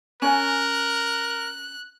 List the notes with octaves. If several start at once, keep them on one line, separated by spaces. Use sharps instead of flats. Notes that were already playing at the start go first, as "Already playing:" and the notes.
C#4 A#4 C#5 G#5 F#6